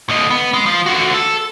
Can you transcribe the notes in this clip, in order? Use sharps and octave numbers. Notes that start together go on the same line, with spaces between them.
D3 D#5
B3
G#3
F3
D3 F#4
A4